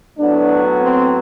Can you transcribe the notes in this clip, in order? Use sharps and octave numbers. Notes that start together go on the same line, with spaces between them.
A2 F#3 B3 D4
C4